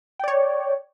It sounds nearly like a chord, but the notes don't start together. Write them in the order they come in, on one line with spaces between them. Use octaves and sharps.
G5 D5 C#5